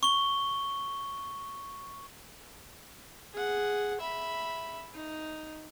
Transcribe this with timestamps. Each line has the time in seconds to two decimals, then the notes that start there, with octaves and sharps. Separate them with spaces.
0.03 C#6 G7
3.34 G#4 F#5
4.00 E5 B5
4.94 D#4